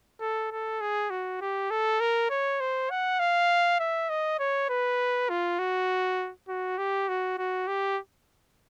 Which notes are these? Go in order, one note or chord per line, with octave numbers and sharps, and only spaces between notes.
A4
A4
G#4
F#4
G4
A4
A#4
C#5
C5
F#5
F5
E5
D#5
C#5
B4
F4
F#4
F#4
G4
F#4
F#4
G4